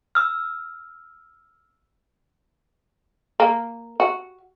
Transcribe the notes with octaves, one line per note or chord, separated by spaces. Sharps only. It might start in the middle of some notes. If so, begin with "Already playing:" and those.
E6 F6
A#3
F#4